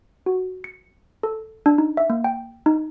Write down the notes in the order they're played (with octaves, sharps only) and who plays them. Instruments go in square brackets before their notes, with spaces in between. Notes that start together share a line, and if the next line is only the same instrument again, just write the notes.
[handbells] F#4
C#7
A4
D4
D#4
E5
A#3
G5
D#4